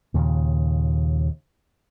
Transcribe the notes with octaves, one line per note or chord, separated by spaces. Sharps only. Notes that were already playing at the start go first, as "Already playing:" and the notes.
D#2 A#2 C#3